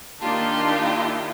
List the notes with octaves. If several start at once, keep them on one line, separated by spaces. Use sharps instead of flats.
D#3 A#3 D4 D#4 F4 G4 A5
E4